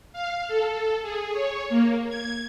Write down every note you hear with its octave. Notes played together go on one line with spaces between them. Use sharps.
F5
A4
G#4
C#5
A#3
G#6